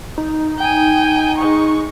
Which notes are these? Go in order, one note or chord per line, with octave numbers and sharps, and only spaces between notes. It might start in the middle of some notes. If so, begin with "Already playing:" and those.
D#4
G5 G#5
G#3 C#6